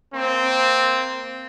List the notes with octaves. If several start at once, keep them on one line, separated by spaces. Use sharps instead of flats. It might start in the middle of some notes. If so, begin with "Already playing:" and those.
A#3 C4